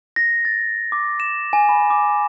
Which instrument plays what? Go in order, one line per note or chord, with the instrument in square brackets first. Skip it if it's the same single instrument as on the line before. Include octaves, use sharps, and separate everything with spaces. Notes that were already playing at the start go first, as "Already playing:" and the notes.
[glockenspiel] A#6
A6
D6
E7
G#5
B5
D6